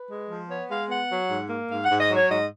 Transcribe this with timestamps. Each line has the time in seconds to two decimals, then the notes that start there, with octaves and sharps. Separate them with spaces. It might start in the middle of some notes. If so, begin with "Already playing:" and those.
Already playing: B4
0.09 G#3
0.28 F3
0.49 B3 C#5
0.69 G#3 F5
0.89 B3 F#5
1.10 F#3
1.30 G#2
1.49 A#3
1.70 G#2 F5
1.85 G#2 F#5
2.00 D#5
2.10 F#3 C#5
2.30 G#2 D#5